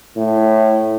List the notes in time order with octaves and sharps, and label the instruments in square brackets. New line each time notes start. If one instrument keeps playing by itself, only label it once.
[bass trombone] A2